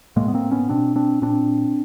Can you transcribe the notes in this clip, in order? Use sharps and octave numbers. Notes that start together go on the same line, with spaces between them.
A2 G#3 A#3
B3
A#3 C4
B3 C#4
B2 C4 D4
C4 D4
A#2 C4 D4